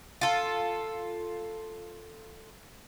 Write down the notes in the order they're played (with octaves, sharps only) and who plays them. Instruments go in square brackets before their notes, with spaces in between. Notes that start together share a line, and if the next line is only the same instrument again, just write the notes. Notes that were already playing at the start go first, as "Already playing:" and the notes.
[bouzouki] F4 A4